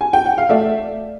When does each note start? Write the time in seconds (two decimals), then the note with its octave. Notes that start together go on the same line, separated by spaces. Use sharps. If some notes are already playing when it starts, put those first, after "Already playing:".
0.01 G#5
0.13 G5
0.26 F#5
0.38 F5
0.49 A3 D5 E5